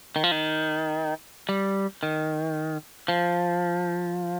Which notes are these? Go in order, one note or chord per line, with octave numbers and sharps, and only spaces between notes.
D#3
F3
D#3
G3
D#3
F3